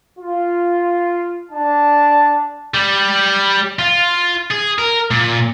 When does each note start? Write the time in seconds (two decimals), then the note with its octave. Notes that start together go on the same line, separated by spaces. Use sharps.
0.19 F4
1.51 D4 A5
2.74 G3
3.79 F4
4.51 G#4
4.79 A#4
5.11 A#2